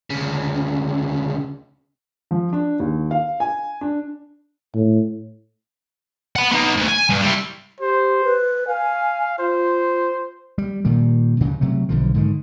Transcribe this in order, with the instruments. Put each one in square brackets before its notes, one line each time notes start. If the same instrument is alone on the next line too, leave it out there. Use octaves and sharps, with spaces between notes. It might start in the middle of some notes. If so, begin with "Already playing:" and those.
[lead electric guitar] D2 C#3
[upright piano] F3
D4
D#2
F5
G#5
D4
[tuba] A2
[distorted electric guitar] F#5 B5
B3 D#4
D2
G#5
G2
G3 E4
[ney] G4 [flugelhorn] C5
[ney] B4
[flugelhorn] F5 [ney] G#5
[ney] F4 [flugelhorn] C5
[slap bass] G3
A#2 D#3 G3
D2 G2 C#3
C3 F#3 A3
B1 D3 F3
G#2 D3 D#3